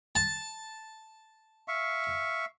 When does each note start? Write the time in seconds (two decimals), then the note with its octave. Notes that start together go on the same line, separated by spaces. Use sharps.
0.15 A5
1.68 E5 F5 C#6